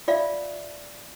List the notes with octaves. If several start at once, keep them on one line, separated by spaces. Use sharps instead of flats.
F4 D5 E5 F5